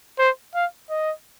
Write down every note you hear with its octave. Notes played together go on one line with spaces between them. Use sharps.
C5
F5
D#5